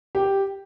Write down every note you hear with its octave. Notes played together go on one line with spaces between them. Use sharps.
G4